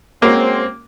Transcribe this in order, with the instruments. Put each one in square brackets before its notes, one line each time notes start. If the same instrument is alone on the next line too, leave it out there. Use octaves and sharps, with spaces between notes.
[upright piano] G#3 C#4 F#4 [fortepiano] A#3 [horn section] C4